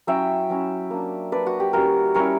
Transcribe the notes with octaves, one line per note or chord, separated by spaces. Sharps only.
F#3 C#4 E4 E5 G5
F#3 C#4 E4
A#3 D4
A#3 D4 B4 D5
F#4
G4
G3 C#4 E4 F#4 A#4
G3 C#4 E4 A#4 C#5